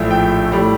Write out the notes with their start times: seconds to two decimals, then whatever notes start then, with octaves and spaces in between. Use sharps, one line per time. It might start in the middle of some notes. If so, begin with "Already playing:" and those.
Already playing: A#1 A2 F3 E5
0.10 G5
0.52 A2 G3